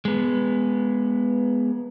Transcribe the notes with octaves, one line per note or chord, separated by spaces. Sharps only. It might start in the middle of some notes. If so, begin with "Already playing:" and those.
G#3 B3